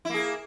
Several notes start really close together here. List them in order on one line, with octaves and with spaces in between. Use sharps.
E4 A#3 G#4